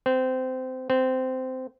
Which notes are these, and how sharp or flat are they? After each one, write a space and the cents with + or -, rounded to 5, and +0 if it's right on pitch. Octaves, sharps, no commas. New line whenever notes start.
C4 -20
C4 -15